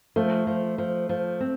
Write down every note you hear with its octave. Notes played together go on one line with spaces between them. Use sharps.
F3 A3
F3
F3
F3
C4